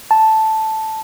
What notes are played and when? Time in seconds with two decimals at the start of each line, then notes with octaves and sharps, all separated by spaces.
0.11 A5